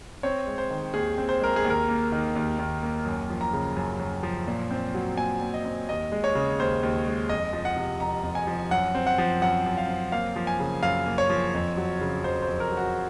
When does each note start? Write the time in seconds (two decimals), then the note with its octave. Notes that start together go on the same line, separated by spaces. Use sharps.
0.23 C4 C#5
0.47 G#3
0.58 C5
0.70 D#3
0.94 D#2 G#4
1.18 C4
1.29 C5
1.41 G#3 A#4
1.56 G#4
1.65 D#2
1.70 A#4
1.89 A#3
2.12 D#3
2.36 D#2
2.59 D#2
2.83 A#3
3.05 F#2
3.30 F3
3.41 A#5
3.53 C#3
3.77 F#2
4.00 F#2
4.23 F3
4.47 A#2
4.71 C4
4.94 F#3
5.17 A#2 G#5
5.41 A#2
5.54 D#5
5.65 C4
5.89 D#2 D#5
6.12 G#3
6.24 C#5
6.35 C#3
6.60 D#2 C5
6.83 D#2
7.07 G#3
7.29 F2 D#5
7.53 F3
7.65 F#5
7.77 C3
8.00 F2 A#5
8.23 F2
8.35 G#5
8.47 F3
8.71 F#2 F#5
8.95 C4
9.07 F#5
9.18 F3
9.42 F#2 F#5
9.66 F#2
9.78 F5
9.88 C4
10.12 A#3 F5
10.36 F3
10.47 G#5
10.60 C#3
10.83 F#2 F5
11.06 A#3
11.18 C#5
11.30 F3
11.54 F2
11.77 F#3
12.01 C#3
12.24 F2 C5
12.42 C5
12.48 F2
12.60 A#4
12.71 F#3
12.77 F#4